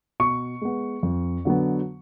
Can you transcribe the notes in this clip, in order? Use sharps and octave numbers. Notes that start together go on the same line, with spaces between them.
B2 C#6
G#3 B3
F2
D3 F#3 B3